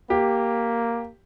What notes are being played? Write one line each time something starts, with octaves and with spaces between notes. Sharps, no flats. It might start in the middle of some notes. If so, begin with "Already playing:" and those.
A#3 G4